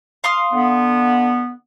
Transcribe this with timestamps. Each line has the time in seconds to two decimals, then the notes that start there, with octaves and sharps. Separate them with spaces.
0.24 F5 C6 D#6
0.53 D3 B3